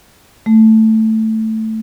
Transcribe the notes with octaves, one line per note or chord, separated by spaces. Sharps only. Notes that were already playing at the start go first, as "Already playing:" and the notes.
A3